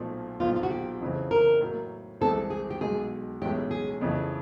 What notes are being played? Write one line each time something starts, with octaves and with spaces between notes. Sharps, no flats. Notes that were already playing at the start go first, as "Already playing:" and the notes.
Already playing: B1 A#2 F3 A3
B1 A#2 F3 F4
F4
F#4
G4
F2 C#3 E3 A3 C4
A#4
A2 F#3 A#3
C2 C3 E3 G#3 C4 A4
G#4
G4
B1 B2 G#3 G#4
B1 A2 E3 G#3 C#4 G4
G#4
F2 C#3 E3 A3